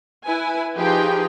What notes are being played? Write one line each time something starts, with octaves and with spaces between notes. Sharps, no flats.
E4 B4 G#5
F3 D#4 G4 G#4 B4 G5